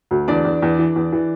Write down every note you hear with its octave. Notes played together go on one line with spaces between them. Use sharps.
D2
E2 D4 D5
E2
E2
E3
E2
E3